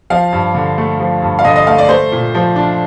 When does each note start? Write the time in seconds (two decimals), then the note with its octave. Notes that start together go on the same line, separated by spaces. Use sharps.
0.10 F3 F5
0.33 G2
0.55 D3
0.78 A3
1.00 F3
1.22 G2
1.39 F5
1.45 D3 D#5
1.56 D#5
1.67 A3 F5
1.78 D5
1.89 A3 C5
2.12 A#2
2.35 F3
2.56 D4